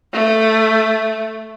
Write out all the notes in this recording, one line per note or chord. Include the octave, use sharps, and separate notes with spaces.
A3